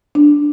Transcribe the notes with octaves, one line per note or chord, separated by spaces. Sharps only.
D4